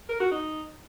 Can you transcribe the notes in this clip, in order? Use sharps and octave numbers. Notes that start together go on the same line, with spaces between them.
A#4
F#4
D#4